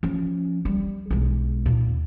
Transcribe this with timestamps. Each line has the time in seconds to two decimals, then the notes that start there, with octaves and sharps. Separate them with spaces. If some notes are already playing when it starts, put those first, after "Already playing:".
0.03 F3 C#4
0.65 G3
1.10 B1 G#3
1.66 D#2 A#2